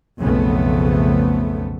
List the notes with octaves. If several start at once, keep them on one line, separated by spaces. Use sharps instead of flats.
B1 F2 C#3 A3 B3